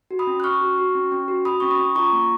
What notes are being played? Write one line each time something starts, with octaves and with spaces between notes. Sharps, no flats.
F#4
B5 D#6
C#4
F#6
C#4 C#6 F6
F#4
F#4
C#4
C#4
F#4
F#4 B5 D#6
C#4 C#6
B5 D#6
C#4
F4 A#5 C#6
A#3